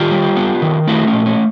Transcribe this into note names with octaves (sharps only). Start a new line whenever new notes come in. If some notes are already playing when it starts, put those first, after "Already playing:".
Already playing: D#3 F4 G4
G3
B3
D#3
A3 E4 F#4
C#4
A#2
C#4